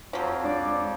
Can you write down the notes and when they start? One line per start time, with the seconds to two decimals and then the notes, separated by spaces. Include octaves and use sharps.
0.13 F2 F3 F#3 C#5
0.44 G#3 D4 D5